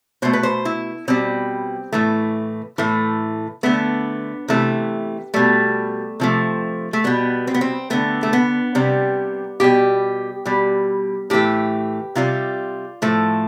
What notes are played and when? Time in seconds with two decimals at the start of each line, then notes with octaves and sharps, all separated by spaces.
0.22 B2 A3 C5
0.33 B4
0.43 C5
0.65 E4
1.08 B2 G3 C4
1.92 A2 E3 A3
2.78 A2 E3 A3
3.63 D3 A3 B3
4.48 C3 E3 A3
5.34 B2 G3 A3
6.20 C3 F3 A3
6.93 A3
7.04 B2 G3 B3
7.47 C4
7.54 B3
7.61 C4
7.90 D3 A3 B3
8.23 A3
8.33 B3
8.75 C3 G3
9.60 B2 G3 G4
10.46 B2 G3
11.30 A2 E3 A3 G4
12.15 C3 G3 F4
13.02 A2 F3 A3